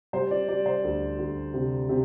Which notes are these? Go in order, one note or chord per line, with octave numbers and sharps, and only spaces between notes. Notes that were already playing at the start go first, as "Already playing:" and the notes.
G3 C5
D5
G3 D5
C5
D2
D2
C3
C3